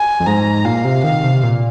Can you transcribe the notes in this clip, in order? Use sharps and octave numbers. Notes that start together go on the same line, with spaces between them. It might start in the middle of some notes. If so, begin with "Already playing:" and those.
Already playing: G#5
F2
G#2 A#5
A#2 F5
C3
D#3 F5
C3
A#2